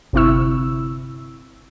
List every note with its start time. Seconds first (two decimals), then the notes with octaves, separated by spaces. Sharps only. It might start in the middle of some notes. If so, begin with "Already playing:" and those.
0.13 G1 C3 C4 E4 C#6 E6